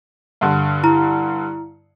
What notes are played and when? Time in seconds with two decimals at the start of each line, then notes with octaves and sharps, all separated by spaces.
0.41 G2 D3
0.83 E4 A#5